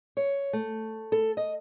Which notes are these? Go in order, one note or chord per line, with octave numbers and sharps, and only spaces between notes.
C#5
A3
A4
D#5